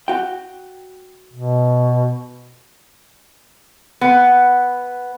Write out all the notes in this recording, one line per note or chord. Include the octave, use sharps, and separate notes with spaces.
F#4 G5
B2
B3